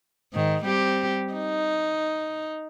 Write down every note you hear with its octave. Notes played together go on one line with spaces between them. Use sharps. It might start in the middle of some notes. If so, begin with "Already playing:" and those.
G#2 D#3
G3 C4 G4
D#4